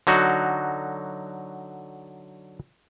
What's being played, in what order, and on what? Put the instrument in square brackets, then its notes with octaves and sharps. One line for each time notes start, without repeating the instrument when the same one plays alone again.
[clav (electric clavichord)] D3 F#3 D#4 F#4